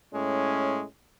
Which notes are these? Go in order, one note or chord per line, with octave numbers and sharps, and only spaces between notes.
A2 G#3 C#4